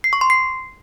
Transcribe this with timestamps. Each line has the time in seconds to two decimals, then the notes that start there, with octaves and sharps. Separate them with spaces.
0.04 C7
0.13 C#6
0.21 C6
0.30 C7